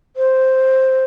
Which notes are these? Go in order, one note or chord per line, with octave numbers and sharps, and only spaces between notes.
C5